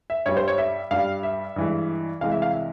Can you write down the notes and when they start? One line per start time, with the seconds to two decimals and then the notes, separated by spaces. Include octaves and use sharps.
0.10 E5
0.26 G2 G3 C#5
0.37 C5
0.48 C#5
0.58 E5
0.91 G2 G3 F5
1.23 E5
1.56 G2 E3 G#3
2.21 C2 C3 E3 G#3 F5
2.32 E5
2.42 F5
2.53 E5